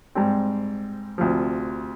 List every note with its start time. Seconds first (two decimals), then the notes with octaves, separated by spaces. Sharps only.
0.15 G#2 G3 C4
1.18 D2 C3 F3